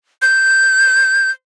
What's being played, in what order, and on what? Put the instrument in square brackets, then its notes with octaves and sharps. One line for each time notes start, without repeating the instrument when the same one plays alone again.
[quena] G6